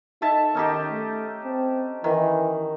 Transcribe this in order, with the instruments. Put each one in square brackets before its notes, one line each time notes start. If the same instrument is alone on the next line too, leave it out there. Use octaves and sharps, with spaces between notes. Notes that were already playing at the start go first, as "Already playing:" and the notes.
[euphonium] D#4 [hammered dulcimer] A4 E5 A5
[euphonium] D#3 [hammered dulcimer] C#4 D#4 G4
[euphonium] A3
C4
[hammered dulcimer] D#3 [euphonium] E3